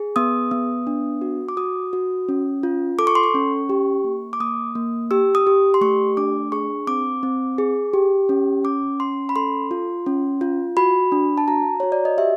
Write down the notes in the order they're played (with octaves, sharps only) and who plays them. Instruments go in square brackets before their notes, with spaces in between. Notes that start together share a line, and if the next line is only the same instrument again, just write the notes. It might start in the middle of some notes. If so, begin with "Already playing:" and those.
Already playing: [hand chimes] G#4
B3 D#6
B3
D4
F#4
D6
F#4 D#6
F#4
C#4
F4
A4 D6
C#6
C6
C#6
C#4
G4
A#3
D6
A#3 D#6
A#3
G4 E6
D#6
G4
C6
A3 C#6
D4 D6
G#4 C#6
C4 D6
C4
G#4
G4
C#4
C#4 D6
C#4 C6
B5
A4 C6
F4
C#4
F4
F#4 B5
D4
A5
F#4 A#5
F#4 C#5
D5
D#5
G4 E5